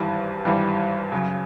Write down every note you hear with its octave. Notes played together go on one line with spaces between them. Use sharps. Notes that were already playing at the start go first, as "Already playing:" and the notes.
Already playing: G#1 G2 E3 G3
G#1 G2 E3 G3
F#2 C#3 F#3